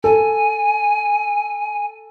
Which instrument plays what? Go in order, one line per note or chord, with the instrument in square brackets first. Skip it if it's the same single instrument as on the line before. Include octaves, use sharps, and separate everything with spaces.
[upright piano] A4 [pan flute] G#5